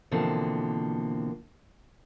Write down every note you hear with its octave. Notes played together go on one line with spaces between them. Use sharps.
B2 D3 E3 F3 A#3 C4